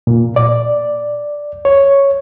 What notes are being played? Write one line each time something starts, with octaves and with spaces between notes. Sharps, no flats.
A#2
D5
C#5